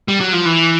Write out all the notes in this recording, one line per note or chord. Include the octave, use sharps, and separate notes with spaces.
G3
F#3
F3
E3